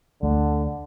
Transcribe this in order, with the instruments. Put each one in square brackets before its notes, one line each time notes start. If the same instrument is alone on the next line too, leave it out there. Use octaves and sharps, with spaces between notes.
[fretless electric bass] D2 A3 [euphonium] D3